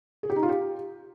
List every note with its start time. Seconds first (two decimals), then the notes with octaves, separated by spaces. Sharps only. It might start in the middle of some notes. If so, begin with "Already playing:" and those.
0.23 G#4
0.30 G4
0.36 D#4
0.43 F4
0.49 G4